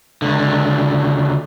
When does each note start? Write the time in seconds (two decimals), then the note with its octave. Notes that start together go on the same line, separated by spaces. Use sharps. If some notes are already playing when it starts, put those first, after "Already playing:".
0.22 C#2 D3